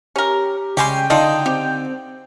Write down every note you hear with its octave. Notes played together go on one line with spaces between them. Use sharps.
C#4 G4 A#4
C#3 G3 G#3 G4 C#5 G5 G#5 C6
D3 D#4 F4 A4 D#5
C4 G4